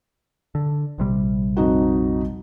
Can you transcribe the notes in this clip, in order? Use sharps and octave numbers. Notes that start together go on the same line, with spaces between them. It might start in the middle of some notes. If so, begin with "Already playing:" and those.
D3
A#1 C3 G3
F2 D#4 F#4